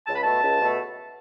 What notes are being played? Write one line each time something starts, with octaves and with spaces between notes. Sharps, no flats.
C#2 A5
B5
B2 A3 A5
C#2
B2 A3